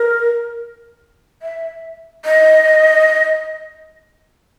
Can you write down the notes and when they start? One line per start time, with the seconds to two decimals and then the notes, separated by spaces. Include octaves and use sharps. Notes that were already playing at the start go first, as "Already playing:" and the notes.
Already playing: A#4
1.42 E5
2.25 D#5